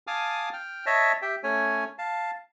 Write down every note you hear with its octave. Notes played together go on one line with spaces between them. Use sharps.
F5 G#5 A5 D6 D#6 F6
G5 F6
C#5 D#5 E5 A5
G4 E5 G5
A3 C#4 C#5 G#5
F5 A5